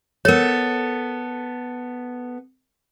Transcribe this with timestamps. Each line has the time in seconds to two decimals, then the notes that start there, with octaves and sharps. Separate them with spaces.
0.25 B3 A4 A#4 C#5